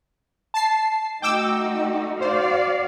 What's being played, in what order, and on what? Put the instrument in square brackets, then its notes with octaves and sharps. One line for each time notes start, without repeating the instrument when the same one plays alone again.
[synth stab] A5 C7
[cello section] A3 D#4 F#4 [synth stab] G5 D6 E6
[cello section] F#4 D5 F5 [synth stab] C5